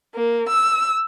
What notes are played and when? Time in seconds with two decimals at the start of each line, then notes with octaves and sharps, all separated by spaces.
0.14 A#3
0.50 E6